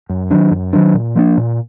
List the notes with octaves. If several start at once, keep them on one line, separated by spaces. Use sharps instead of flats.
F#2
D#3 F#3 D4
F#2
D#3 F#3 D4
A#2
F3 A#3 D4
A#2